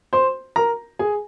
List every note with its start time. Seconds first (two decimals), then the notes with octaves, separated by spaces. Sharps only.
0.13 C5 C6
0.56 A#4 A#5
0.99 G#4 G#5